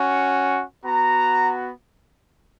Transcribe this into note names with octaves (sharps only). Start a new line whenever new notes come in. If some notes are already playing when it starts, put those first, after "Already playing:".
Already playing: C#4 F#4
B3 F#4 A#5